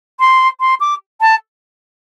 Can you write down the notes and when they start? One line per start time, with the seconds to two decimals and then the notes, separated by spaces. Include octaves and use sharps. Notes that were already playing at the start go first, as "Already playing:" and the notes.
0.20 C6
0.60 C6
0.80 D6
1.21 A5